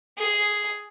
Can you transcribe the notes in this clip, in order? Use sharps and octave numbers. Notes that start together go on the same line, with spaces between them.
G#4